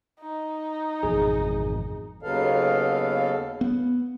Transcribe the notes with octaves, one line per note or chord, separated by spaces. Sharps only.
D#4
G#1 F2 B2 E3 G#4
D#2 C#3 F#3 B3 A4 F5
B3